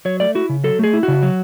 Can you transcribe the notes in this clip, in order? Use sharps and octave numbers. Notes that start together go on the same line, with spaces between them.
F#3 C#5
A3 D5
E4 F#4
C#3
F#3 A4
A3 G#4
E4
F#4
C#3
F#3